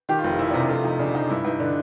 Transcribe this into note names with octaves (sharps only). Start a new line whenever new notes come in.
D#3 G4
F4
F1
F4
F2 E4
D4
C3 D#4
A3 F4
F2 D#4
C#3 D4
F3 D#4
G2 E4
G2 D#4
D3 D4